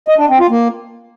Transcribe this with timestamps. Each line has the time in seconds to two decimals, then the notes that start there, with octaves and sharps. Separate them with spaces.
0.08 D#5
0.18 D4
0.29 C4
0.40 F4
0.50 A#3